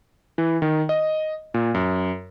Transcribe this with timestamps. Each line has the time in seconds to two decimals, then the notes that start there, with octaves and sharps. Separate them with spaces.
0.38 E3
0.62 D#3
0.89 D#5
1.54 A#2
1.74 F#2